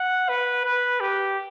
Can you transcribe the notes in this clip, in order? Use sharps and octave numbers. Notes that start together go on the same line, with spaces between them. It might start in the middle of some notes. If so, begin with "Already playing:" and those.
Already playing: F#5
B4
B4
G4